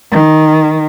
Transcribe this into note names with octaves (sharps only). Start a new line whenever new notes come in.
D#3